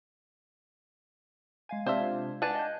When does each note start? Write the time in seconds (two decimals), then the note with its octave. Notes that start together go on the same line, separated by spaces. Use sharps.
1.69 G#3 F5 G#5 G#6
1.86 C3 D4 F4 C5 E5
2.42 D4 B4 F#5 G#5 A5
2.55 D#5 G6